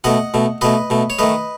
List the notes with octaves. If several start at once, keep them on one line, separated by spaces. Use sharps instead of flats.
B2 A3 D#5 F#5
B2 A3
B2 A3 B4 D#5
B2 A3
C#5
D#3 A3 B4 D#5